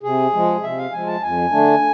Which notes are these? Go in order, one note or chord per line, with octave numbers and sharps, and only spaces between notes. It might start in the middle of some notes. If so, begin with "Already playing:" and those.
C3 G#4
F3 G#3
C3 E5
F5
F3 G#3 G#5
A5
F2 G#5
D3 A3 D4